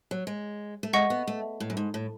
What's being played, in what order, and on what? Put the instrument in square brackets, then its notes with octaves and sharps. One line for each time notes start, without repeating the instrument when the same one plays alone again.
[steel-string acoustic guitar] F#3
G#3
A3
[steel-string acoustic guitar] G#3 [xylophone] D#5 F#5 C#6
[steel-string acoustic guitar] B3
A3
A2
F#2
G#2
A2